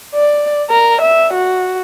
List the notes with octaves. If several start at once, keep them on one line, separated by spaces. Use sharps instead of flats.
D5
A#4
E5
F#4